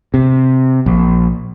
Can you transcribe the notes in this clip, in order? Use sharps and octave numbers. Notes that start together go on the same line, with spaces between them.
C3
A#1